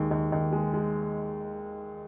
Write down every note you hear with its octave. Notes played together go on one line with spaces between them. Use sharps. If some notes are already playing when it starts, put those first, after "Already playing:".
Already playing: D#2 G#3
D#2
D#2
G#3
G#3